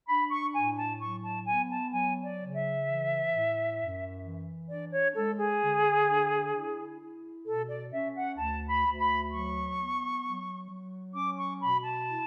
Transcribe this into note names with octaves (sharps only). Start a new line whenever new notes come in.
D4 B5
C#6
A2 G#5
A5
F#3 C#6
A5
B3 G#5
A5
F#3 G#5
D5
C#3
E5
E3
A2
F#2
E3
D4 D5
C#5
G#3 A4
G#4
D3
D4
E4
E4
B2 A4
D5
C#4 E5
F#5
D2 A5
B5
D2
B5
F#3 C#6
B3
F#3
F#3
C#4 D6
C#6
B2 B5
A5
E4